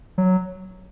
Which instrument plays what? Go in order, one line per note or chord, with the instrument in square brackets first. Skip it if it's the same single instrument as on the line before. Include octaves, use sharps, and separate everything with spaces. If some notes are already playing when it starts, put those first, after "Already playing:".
[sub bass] F#3